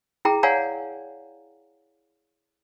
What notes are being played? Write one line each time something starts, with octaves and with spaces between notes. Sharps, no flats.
E4 G#4 G5 A#5
C#5 D5 F5 F#5 G#5 A#5